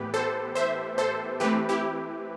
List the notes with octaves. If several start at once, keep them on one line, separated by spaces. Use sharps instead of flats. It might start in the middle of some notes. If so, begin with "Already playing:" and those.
Already playing: A2 E3 B3 G4 B4
A4 C5
C5 E5
A4 C5
E3 A3 C4 G4 B4
E4 G4